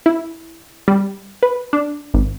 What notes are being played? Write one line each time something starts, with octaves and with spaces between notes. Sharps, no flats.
E4
G3
B4
D4
G#1